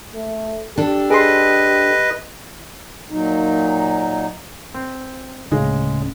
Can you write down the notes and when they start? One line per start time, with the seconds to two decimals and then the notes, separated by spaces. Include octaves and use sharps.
0.14 A3
0.77 D4 G4 A4
1.10 G#4 B4 D#5 C6
3.10 A#2 F#3 D#4
4.75 C4
5.52 D1 C#3 G#3